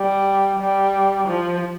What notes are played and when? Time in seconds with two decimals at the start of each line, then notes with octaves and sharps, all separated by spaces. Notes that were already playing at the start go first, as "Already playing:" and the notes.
Already playing: G3
0.59 G3
1.27 F3